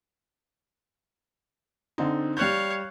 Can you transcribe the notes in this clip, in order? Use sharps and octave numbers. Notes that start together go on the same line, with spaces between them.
D3 C4 D#4
G3 C#5 F5 F#6 G6